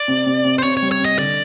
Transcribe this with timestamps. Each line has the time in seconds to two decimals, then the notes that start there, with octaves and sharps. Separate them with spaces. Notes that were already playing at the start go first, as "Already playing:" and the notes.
Already playing: D5
0.08 C3
0.26 C3
0.45 C3
0.58 C5
0.63 C3 C#5
0.77 C#5
0.82 G3
0.92 C#5
1.00 C3
1.05 D#5
1.18 D3 D5